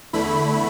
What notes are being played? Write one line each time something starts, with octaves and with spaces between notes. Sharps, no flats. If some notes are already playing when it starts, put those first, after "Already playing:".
E2 D3 A3 E4 B5